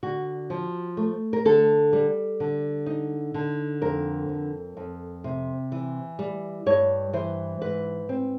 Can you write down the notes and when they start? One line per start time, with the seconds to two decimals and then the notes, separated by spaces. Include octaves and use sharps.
0.03 D3 F#4
0.50 F3
0.97 A3
1.33 A#4
1.45 D3 A4
1.93 G3
2.40 D3
2.86 D#4
3.34 D3
3.82 F2 A#4
4.29 F2
4.77 F2
5.24 C3
5.72 E3
6.19 G3
6.66 G2 C#5
7.13 E3 C5
7.62 G#2 B4
8.09 C4